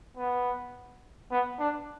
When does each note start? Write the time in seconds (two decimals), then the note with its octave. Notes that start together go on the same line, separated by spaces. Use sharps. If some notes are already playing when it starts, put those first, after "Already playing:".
0.17 B3
1.32 B3
1.60 D4